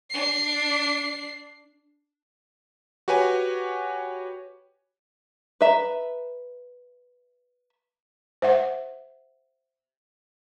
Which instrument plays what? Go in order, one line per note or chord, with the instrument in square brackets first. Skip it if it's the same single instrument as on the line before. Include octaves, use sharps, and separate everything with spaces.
[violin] D4 C7
[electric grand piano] F#4 G4 B4 C#5 G#5
[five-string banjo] B4 E5 A#5
[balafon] C5 E5 F#5